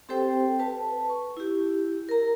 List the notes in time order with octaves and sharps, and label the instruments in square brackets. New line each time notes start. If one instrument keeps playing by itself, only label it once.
[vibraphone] C4 G4 A4 C5 G5
B4 A5
C#6
E4 G4
A#4 A#5